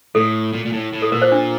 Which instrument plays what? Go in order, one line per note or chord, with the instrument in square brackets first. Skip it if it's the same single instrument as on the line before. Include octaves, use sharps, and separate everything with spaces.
[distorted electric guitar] A2 [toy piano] A4
[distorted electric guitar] A#2
A#2
A2
A2
[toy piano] A4
[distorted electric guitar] A#2 [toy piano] A#4
[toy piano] C5
D4